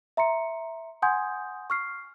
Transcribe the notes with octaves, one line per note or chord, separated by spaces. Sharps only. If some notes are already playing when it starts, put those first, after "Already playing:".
E5 A#5 C6 C#7
F#5 G#5 C6 D#6 G6 G#6
C#6 F6 C7